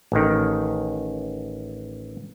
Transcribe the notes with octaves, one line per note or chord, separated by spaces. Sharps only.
A1 D#3